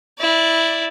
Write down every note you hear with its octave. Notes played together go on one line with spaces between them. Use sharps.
E4 D5